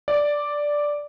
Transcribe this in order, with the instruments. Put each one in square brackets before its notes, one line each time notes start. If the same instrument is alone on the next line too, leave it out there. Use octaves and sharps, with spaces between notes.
[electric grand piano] D5